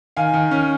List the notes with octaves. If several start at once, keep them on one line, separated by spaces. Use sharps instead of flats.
D#3 F5 G#5
D#3
C#4